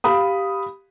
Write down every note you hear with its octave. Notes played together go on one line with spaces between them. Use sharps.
G4 F5 B5 D#6